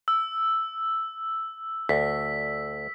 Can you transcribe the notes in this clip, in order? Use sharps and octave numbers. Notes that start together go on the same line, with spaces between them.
E6
D2 B6